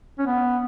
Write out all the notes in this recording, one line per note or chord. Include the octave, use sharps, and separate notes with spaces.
C#4
B3